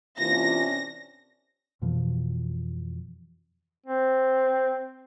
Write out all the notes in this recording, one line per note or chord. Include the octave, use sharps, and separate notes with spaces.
C3 E3 A#3 C#4 D4 F4 A#6
F2 B2 E3 F3
C4